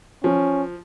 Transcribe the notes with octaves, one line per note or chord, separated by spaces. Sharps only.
F3 C#4